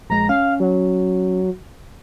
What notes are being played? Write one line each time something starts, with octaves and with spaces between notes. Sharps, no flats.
A#1 G#3 A#5
C#4 F5
F#3